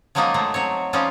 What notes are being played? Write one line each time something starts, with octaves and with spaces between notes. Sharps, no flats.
F3 F#3 G#3 A#3 D#4 F4
F#3 G#3 A3
F#3 C4 C#5
F3 G3 G#3 C#4 D#4 F4